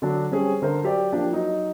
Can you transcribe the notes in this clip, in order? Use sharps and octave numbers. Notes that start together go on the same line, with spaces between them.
D3 F#3 D4
G3 C4 C#4 G4 G#4
D3 A#4 C5
F#3 G4 D5
F3 A#3 D4 G4
F#3 D#4